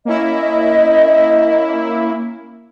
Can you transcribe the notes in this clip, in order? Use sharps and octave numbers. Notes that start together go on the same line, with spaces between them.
A#3 C#4 E4 D#5